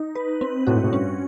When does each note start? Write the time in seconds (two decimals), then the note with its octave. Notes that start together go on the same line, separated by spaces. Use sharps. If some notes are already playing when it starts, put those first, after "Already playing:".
Already playing: D#4
0.15 B4
0.41 C4
0.67 A2 F#4
0.75 G#2
0.84 A2
0.92 G2 C#4